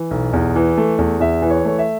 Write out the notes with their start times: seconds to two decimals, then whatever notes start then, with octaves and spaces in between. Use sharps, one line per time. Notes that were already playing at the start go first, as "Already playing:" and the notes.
Already playing: E3
0.11 B1
0.33 E2
0.56 E3
0.78 A3
0.98 E2
1.20 E2 E5
1.42 E3
1.50 C#5
1.65 A3 C#5
1.79 E5